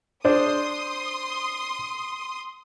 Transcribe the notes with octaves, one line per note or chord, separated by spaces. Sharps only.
D4 C5 C6 D#6